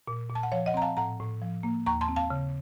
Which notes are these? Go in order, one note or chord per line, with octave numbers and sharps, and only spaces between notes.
A#2
A#2
A5
F#5
F3 C#5 F5
D#5 F#5
C4 A#5
F5 A5
A2 F#5 A#5
A2
F3
A#3
D#2 A#5 C#6
A5 C6
C4
F5 A5
C#3